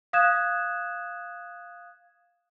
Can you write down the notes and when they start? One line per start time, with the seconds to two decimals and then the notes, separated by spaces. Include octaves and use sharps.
0.13 F5 D#6 F#6 G#6 E7